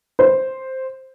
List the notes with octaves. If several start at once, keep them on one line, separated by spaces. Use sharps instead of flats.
C5